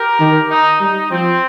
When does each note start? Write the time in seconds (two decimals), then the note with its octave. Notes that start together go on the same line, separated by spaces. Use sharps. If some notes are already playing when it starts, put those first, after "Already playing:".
Already playing: G4 A#4
0.20 D#3
0.50 D#4
0.80 G3 D#4
1.11 F3 C4